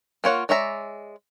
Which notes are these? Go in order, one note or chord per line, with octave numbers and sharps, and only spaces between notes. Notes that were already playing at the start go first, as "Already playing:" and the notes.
A#3 F4 C#5 F#5
G#3 C#5 D5 E5 A#5